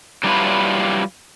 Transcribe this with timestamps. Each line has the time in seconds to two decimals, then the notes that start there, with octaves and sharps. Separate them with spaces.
0.24 F#3 G3 D4 E4 F4 B4